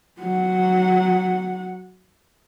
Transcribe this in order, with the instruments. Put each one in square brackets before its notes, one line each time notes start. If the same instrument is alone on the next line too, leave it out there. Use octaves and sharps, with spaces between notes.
[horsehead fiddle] F#3 F#5